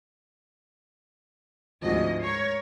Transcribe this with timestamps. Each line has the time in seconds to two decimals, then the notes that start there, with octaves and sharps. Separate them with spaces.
1.82 D2 G#2 F3 C4 F#4 D#5
2.19 A#4 C#5 C7